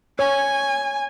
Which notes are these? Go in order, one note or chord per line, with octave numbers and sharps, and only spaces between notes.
C#5 G#5